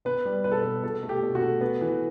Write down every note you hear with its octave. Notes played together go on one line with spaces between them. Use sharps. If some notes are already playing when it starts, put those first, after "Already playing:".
B3 B4
G3
B2 B4
A4
B2 B4
B2 A4
A3
G4
B2
F#4
A3
B3
E3